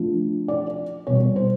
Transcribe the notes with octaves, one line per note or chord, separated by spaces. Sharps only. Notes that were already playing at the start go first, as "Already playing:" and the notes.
Already playing: F3 A3 D4 F4
D5
B2 G3 B3 C#5
C5